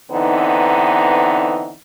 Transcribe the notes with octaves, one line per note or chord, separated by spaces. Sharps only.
D3 E3 B3 C4 D#4